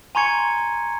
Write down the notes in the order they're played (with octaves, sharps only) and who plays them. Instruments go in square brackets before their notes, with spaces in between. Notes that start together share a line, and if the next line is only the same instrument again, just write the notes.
[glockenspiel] G#5 A#5 C6 C#6 G#6 C#7